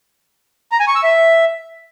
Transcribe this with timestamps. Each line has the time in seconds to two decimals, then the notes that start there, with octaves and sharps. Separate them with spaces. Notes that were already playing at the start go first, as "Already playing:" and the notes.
0.72 A#5
0.80 G#5
0.88 C#6
0.95 E6
1.03 E5